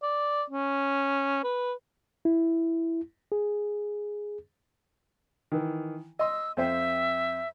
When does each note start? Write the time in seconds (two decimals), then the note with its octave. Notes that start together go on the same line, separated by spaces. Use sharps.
0.03 D5
0.50 C#4
1.43 B4
2.25 E4
3.32 G#4
5.52 D#3 E3
6.19 D#5 C6 E6
6.57 F2 C5 E5 G5